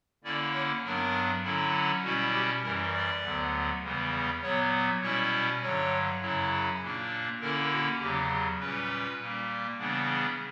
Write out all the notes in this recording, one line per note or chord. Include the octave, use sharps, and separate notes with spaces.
D3 A#3 C#4 E4 D5
C#5
G2 F#3 B3 D4 A#4
D3 F#3 C#4 E4
B2 G3 C#4 E4 F#4
G4
F#2 E3 G3 A#4
D5
D2 D3 F#3 B3
E2 C#3 E3 G3 B3
A#2 F#3 B3 C#5
B2 G3 C#4 E4 C#5
G2 D3 F#3 C#5
F#2 C#3 F#3 C#4 E4
A#2 A#3 D4
D3 A#3 C#4 E4 A#4
F#4
E2 C#3 F#3 G4
A#2 G3 C#4 B4
A#2 G3 A#3
C#3 E3 G3 B3 D4